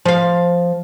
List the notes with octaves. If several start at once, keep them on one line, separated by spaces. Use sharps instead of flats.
F3 F5